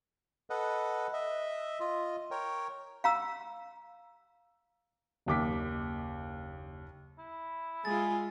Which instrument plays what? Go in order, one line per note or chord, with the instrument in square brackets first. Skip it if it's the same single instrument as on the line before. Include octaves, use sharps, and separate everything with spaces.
[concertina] A4 B4 D#5 F#5
D#5 E5
F4 D#5
A#4 C#5 G5
[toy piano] F5 A#5 E6
[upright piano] F#1 D#2 D6 B6
[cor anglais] E4
[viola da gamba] G#3 F4 [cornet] G#4 [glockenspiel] A6